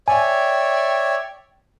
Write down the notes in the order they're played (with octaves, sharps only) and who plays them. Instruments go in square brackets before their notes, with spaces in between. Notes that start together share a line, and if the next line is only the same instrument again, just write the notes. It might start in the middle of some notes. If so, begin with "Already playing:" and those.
[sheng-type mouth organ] C#5 D5 E5 [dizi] G5 [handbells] G#5